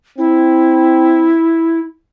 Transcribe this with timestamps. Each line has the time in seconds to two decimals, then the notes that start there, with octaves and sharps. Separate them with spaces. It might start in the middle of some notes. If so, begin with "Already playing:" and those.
0.18 C4 E4